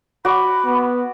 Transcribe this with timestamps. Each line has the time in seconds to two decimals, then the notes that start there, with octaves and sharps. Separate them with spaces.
0.25 F#4 D5 B5
0.66 B3